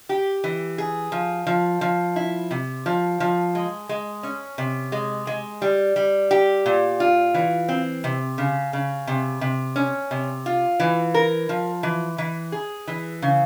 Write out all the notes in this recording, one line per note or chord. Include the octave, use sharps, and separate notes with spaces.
G4
E3
G#4
F3
F3
F3
E4
C3
F3
F3
G#3
G#3
C#4
C3
G#3
G#3
G3
G3
G4
A#2
F4
E3
C4
C3
C#3
C#3
C3
C3
C#4
C3
F4
E3
A#4
F3
E3
E3
G#4
E3
C#3